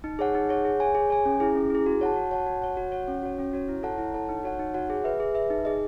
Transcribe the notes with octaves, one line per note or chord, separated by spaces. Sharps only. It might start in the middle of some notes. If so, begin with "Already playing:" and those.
D#4
G#4 C#5 F#5
D#4
G#4 C#5 F#5
G#4
C#5 G#5
G#4
C#5 G#5
C#4
E4 G#4
C#4
E4 G#4
F#4
C#5 F#5 A5
F#4
C#5 F#5 A5
F#4
C#5 F#5
F#4
C#5 F#5
C#4
F#4 C#5
C#4
F#4 C#5
E4
A4 C#5 F#5 A5
E4
A4 C#5 F#5 A5
D#4
F#4 C#5 F#5
D#4
F#4 C#5 F#5
G#4
B4 E5
G#4
B4 E5
D#4
G#4 D#5